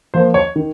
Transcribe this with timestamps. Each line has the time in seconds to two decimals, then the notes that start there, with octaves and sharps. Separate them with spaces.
0.14 F3 A#3 C5
0.34 C#5
0.56 D#3